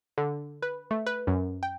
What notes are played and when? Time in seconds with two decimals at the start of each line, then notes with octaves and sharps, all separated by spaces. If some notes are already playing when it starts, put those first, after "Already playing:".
0.18 D3
0.62 B4
0.91 A3
1.07 B4
1.27 F#2
1.63 G5